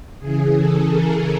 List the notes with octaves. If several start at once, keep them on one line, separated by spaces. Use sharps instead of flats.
C#3 E3 G#4
A4
A#4